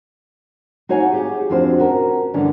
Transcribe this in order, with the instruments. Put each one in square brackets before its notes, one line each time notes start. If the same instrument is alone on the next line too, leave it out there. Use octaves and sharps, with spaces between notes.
[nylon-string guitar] D#4 F#4 C#5 F5 F#5 G#5
G4 G#4
F2 D4 F4 F#4 C5
C#4 F#4 A#4
G2 D3 E3 B3 C#4 D4